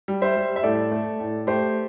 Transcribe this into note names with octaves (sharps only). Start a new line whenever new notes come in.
G3
C5 E5
G3
E5
A2 A4 D5
A3
A2
A3 G4 C5